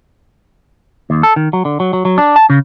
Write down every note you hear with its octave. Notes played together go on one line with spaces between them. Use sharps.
D#2
A4
D#3
F#3
D3
F#3
F#3
F#3
D4
A5
C#3